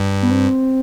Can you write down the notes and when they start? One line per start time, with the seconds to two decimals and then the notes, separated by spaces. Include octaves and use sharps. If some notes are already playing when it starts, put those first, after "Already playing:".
Already playing: G2
0.22 B3
0.31 C4